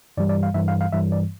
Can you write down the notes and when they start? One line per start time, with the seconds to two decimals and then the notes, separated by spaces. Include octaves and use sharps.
0.17 G2 E3 G3 D5
0.29 D5
0.43 F5
0.54 G2 E3 G3 E5
0.68 F5
0.81 F5
0.93 G2 E3 G3 E5
1.12 D5